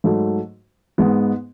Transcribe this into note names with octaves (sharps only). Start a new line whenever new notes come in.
G#2 F#3 A3
G#2 G#3 B3